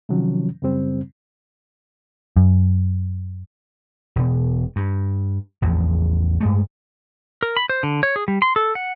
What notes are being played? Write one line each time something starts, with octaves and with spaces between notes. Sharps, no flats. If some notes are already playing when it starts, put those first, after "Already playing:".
C3 D#3 F3 F#3 C#4
F#2 C#3 G3 C4
F#2
E1 B2
G2
A1 E2 F3
G2 G#3 A3
A#4
B5
C5
D3
C#5
G#4
G3
C6
A4
F#5